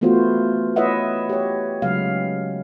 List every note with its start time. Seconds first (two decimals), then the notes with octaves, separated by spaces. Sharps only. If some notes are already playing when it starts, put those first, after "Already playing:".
0.01 E3 A3 B3 F4 F#4 C5
0.76 E4 B4 C#5 D#5 E5 F#5
1.29 G4 C#5
1.82 C#3 F#3 G#3 F5